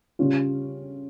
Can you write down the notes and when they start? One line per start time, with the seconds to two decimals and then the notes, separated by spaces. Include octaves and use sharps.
0.19 C#3 G3 C#4 F4